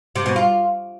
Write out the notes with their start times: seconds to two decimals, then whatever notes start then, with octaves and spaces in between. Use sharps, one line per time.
0.16 C3
0.26 B2
0.36 F4